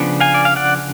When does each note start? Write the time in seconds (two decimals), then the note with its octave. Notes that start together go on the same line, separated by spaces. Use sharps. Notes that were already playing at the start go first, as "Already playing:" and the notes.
Already playing: C#3 F3 B3 D4
0.20 F5 G#5
0.34 D5
0.45 F5
0.56 D5 F#5